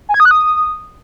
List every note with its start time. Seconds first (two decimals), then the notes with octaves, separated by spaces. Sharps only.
0.09 G#5
0.14 G#6
0.20 D#6
0.25 F#6
0.31 D#6